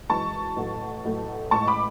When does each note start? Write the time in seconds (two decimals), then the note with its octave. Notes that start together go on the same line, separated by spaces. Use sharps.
0.09 F#2 E3 G#3 A5 C#6
0.56 A1 A2 F#3 A3
1.04 A1 A2 F#3 A3
1.51 A1 A2 G#3 A5 C#6
1.68 B5 D6